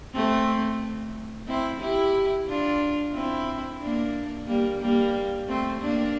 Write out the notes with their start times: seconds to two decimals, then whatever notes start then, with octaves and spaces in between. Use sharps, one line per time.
0.14 A3 C4
1.47 C4 E4
1.81 E4 G4
2.48 D4 F4
3.14 C4 E4
3.81 A#3 D4
4.47 G3 A#3
4.81 G3 A#3
5.47 A3 C4
5.81 A#3 D4